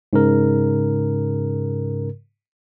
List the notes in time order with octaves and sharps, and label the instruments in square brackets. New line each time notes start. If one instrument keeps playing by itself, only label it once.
[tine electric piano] G#2 C#3 A#4